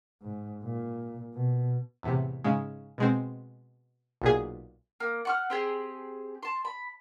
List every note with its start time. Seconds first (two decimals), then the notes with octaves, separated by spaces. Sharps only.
0.22 G#2
0.63 A#2
1.34 B2
2.03 E2 A2 C3
2.44 G#2 C#3 G#3
2.98 B2 G#3 C4
4.22 B1 A#2 G#4
5.00 A#3
5.25 F#5 C#6 F6
5.50 C4 G4 G#4
6.43 A5 C6
6.65 B5